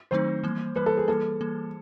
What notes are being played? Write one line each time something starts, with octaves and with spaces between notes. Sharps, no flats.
D#3 F#3 A3 C4 D#4 C5
E3 G3 A#3
E3 G3 A#3 B4
A4
G#4
E3 G3 A#3 A4
E3 G3 A#3